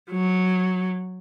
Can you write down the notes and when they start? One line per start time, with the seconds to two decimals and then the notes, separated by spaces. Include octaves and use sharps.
0.11 F#3